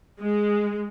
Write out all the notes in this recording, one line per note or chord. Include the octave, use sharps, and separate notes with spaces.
G#3